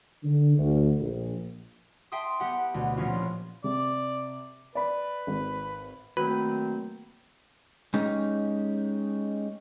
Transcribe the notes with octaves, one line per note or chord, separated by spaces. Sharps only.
D3
D2
A#1
E5 G5 A5 C6 D#6
B3 G4 F#5
D2 B2
A#2 F3 A#3 B3 C#4 F4
A#1
C3 D5
B4 D5 B5
G#1
D#3 F#3 A3 A#3 C4 F#4 B4
G#3 C#4 D#4 G4